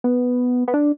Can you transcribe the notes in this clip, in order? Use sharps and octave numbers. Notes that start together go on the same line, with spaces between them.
B3
B3
D4